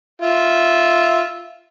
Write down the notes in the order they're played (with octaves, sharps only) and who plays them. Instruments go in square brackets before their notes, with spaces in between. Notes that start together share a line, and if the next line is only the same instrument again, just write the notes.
[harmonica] F4 E5